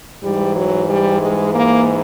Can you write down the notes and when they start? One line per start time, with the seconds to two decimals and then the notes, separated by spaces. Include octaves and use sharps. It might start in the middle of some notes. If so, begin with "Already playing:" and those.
0.23 G#2 E3 G3
0.56 F#3
0.89 G3
1.22 G#3
1.55 A#3